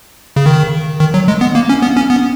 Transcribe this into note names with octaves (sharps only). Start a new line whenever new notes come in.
C#3
D#3
D#3
F#3
G#3
B3
A#3
C#4
B3
C#4
B3